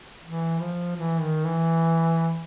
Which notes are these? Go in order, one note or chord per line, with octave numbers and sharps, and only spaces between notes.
E3
F3
E3
D#3
E3